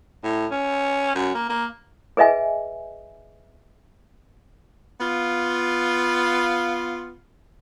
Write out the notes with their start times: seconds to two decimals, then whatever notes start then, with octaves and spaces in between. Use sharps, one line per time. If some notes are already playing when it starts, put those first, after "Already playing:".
0.24 A2
0.51 C#4
1.15 F#2
1.35 A#3
1.49 A#3
2.17 G#4 B4 D#5 E5 G#5
5.01 B3 F4